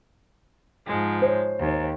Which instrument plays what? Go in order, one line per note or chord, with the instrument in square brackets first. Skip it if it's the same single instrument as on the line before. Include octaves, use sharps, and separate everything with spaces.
[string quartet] G#2 F3 G#3
[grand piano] C5 C#5
[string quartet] D#2